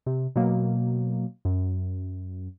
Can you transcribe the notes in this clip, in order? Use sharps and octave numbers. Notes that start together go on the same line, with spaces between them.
C3
B2 F#3 A#3
F#2